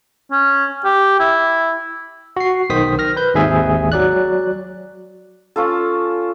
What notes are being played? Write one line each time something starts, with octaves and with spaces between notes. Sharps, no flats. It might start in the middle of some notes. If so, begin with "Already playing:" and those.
C#4
G4
E4
F#4 C7
B1 D#3 C5 D#6 B6
F6 A#6
B4 G6
G#1 D#2 G#2 G#4 E5 G#5
F#3 D5 F#6
C#4 F4 A4